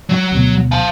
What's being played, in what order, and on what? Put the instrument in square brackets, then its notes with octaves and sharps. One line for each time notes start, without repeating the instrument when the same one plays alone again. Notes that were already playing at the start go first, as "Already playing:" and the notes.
[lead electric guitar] F#3 F#4
[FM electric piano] D2 B2
[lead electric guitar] F5 A5